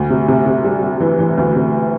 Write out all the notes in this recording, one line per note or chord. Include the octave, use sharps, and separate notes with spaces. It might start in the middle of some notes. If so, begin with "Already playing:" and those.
Already playing: D2
C3
C3
C3
G3
G3
E3
E3
D2
C3